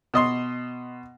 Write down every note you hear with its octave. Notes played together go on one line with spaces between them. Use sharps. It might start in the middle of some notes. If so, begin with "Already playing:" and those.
B2 D#5 C6